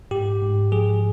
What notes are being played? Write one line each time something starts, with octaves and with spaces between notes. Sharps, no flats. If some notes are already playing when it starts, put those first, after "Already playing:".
G#2 G4
G#2
F3 G#4